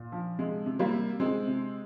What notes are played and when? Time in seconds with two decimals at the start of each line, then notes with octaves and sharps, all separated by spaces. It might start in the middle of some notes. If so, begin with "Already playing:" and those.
Already playing: A#2
0.12 F3
0.39 C3 G#3
0.66 C3
0.79 G3 A#3
0.93 C3
1.19 C3 G#3 C4
1.47 C3